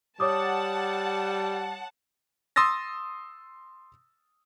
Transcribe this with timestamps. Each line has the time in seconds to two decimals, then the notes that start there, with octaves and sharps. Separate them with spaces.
0.20 G3 C#5 F#5 A5 D6 D#6
2.56 C6 D#6 E6 A6 A#6